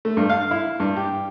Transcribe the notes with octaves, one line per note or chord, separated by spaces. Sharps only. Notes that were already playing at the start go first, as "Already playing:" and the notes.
A3
G2
F5
E4
G2
G4